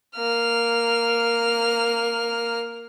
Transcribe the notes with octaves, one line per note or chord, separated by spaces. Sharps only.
A#3 F6